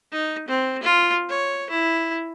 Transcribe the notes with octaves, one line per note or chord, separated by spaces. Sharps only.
D#4
C4
F4
C#5
E4